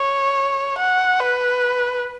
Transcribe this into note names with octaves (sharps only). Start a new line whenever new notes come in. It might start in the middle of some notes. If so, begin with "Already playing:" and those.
Already playing: C#5
F#5
B4